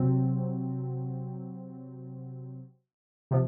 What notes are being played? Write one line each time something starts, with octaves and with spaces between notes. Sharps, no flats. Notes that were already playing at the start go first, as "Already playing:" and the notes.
Already playing: C3 F#3 C4
C3 F3